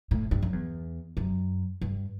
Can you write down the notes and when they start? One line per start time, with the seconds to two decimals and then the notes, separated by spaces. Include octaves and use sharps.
0.11 A2
0.31 G2
0.42 F#2
0.53 E2
1.17 F#2
1.82 G2